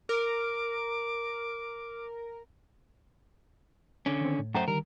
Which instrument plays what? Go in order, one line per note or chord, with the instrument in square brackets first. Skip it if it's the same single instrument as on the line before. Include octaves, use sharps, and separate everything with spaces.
[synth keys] A#4 [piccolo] D6
[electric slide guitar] D3 C#4
[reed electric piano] D#3 C4
A2
[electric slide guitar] F#2 A3 C5 [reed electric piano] F#5 G5 A#5
[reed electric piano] D3 D#3 G3 [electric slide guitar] A#4